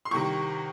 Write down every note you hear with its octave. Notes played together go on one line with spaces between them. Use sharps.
C6
C2 C3 D#3 C#6